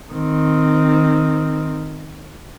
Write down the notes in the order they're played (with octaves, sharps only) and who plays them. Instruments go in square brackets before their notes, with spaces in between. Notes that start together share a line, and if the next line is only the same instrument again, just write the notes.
[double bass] D#3 C4